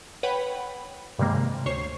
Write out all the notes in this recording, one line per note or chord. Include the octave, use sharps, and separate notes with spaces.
B4 C#5 F#5 G5 B5
G2 C3 D#3 G3 G#3 A#3
D2 C5 C#5 C#6 C7